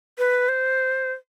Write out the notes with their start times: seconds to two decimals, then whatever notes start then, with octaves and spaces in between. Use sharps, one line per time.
0.18 B4
0.49 C5